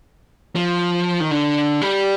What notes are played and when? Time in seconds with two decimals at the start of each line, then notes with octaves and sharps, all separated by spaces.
0.56 F3
1.20 D#3
1.31 D3
1.81 G3